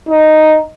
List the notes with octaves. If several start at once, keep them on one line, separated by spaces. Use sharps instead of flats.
D#4